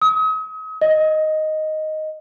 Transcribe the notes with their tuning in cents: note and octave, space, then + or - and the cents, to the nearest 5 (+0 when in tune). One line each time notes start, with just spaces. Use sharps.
D#6 +40
D#5 +0